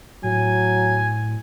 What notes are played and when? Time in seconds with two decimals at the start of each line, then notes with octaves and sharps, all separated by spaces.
0.24 A2 F#3 G#5